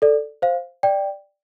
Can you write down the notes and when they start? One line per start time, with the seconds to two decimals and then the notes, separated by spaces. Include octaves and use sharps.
0.02 A4 D5
0.42 C5 F5
0.83 D5 G5